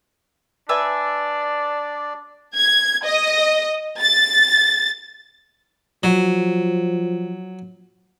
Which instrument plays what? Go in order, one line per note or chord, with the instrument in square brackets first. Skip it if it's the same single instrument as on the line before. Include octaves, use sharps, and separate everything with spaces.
[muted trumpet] D4 [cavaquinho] B4 E5 G#5 [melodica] D5
[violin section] G#6
D#5
A6
[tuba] F3 [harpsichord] F#3